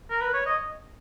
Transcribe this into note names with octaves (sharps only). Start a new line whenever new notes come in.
A#4
B4
C#5
D#5